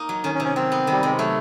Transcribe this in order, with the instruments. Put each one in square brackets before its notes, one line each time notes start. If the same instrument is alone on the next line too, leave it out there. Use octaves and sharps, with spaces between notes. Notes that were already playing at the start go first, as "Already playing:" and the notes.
Already playing: [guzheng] A#3 D#4
F#3
[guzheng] D#3 [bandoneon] C#4
[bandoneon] C#4
[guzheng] C3
[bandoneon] C#4
[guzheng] F#3 [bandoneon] C4
[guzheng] B3
[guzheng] D#3 [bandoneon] G3
[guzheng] C3 [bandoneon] G#3
[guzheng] F#3 [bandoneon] A3